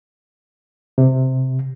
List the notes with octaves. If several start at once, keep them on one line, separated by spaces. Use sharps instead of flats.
C3